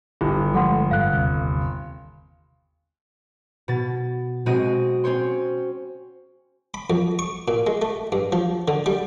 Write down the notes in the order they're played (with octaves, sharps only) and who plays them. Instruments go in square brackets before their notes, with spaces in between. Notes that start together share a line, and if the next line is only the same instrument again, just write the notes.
[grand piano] G1 [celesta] E4 G4
[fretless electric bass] F3 G#3 A3 [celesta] A4 F#5 C6
[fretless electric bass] G2 G3 [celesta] F5 F#6
[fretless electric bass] D#2 C3
[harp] B2 A6
B2 G#3 C4 F#4 D#5 D#6
C4 C#4 C5 C#5 C6
[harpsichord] B5
F2
C#6
A#2
G#3
A3
G2
F3
D3
G3